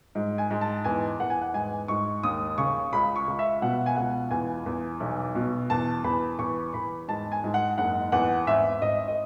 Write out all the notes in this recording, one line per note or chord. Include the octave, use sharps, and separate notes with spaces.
G#2
G#5
G#2
A5
E2 G#5
E2 F#5
G#5
F#5
G#2 G#5
G#2 C#6
D#2 D#6
C#3 C#6
C#2 B5
C#6
C#2
E5
B2 F#5
G#5
C#2 F#5
E2 G#5
E2
B1
B2
E2 A5
E2 B5
E2 C#6
E2 B5
G#2 A5
G#5
G#2
F#5
F#1 F#5
E2 F#5
G#1 E5
G#1 D#5
D#5